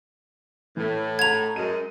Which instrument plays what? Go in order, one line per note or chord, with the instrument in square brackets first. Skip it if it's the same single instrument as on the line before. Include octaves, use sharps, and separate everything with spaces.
[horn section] A2 [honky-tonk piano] E3
[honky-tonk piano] F#5 A5 A#5 [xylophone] G#6 F7
[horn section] F#2 G#3 [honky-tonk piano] D#7